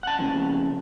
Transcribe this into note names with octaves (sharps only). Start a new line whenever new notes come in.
F#5 A5
F2 C#3